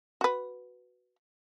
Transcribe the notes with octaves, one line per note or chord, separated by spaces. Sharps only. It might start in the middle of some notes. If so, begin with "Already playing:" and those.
F#4 B4